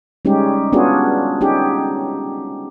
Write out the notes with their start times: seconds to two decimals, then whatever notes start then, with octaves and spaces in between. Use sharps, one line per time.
0.25 G3 G#3 C#4 D#4 G4
0.72 B3 C#4 D4 F4 F#4 G#4
1.41 C#4 D#4 G4 G#4